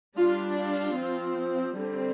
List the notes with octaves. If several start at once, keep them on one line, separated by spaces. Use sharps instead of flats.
G3 D4 F4
F4
F3 C4
D3 G3 C4